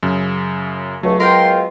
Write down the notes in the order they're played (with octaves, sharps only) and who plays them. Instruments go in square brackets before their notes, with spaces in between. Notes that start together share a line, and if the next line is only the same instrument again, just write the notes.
[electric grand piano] F#2 C#3
[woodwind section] C#2 A3 [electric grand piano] F#3
[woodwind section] G#3 B3 F4 [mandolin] A#4 F5 G5 [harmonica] C6